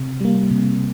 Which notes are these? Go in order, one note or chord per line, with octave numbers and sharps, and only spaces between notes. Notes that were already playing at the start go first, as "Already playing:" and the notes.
Already playing: C3
G3 A#3
C3